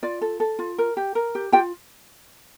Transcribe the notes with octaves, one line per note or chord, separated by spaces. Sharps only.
F4 D5
A4
A4
F4
A#4
G4
A#4
G4
F4 G4 G5